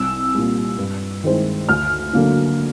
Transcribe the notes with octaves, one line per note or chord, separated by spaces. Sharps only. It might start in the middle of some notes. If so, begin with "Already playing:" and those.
Already playing: C2 E6
A#2 G3
G2
D#3 G#3 C4 E4
D2 F6
D3 F#3 A#3 D4